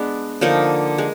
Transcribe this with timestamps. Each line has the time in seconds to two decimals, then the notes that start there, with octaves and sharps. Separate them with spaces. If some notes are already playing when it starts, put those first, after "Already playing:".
Already playing: G#3 B3 D4
0.41 D3 F3 A#3 D#4
0.98 G#3